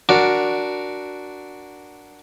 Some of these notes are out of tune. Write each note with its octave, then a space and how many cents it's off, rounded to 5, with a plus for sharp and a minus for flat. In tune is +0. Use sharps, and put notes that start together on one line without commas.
D4 +0 F#4 +0 A#4 +5